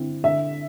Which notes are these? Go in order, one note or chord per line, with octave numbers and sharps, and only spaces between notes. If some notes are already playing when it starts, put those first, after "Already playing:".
Already playing: D3 C4 E4
D3 E5